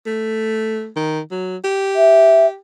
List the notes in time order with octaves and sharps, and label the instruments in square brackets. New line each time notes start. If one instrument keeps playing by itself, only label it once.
[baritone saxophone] A3
D#3
F#3
G4
[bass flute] E5